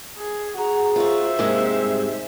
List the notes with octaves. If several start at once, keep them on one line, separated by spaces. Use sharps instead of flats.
G#4
F#4 G#4 A#5
F4 F#4 C5 E5
G#2 C3 G#3 A#3
G3